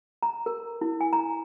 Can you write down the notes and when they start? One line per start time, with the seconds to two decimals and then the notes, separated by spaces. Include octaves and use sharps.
0.23 A#5
0.46 A#4
0.81 E4
1.01 G#5
1.13 A#5